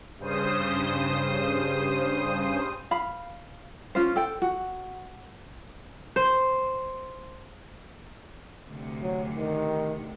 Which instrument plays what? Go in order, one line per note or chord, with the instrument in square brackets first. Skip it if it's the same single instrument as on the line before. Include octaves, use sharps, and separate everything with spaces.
[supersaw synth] G2 C#3 C5 D#6
[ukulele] F5 B5
C#4 F4 C5
A4 G5
F#4
[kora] C5
[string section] D2 C3
[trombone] F#3
D#3